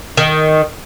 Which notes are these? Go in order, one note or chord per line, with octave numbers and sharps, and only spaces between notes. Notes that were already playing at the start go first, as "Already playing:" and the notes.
D#3